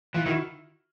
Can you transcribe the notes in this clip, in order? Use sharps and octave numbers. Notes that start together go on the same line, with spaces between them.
E3 F4
D#3 E4 F#4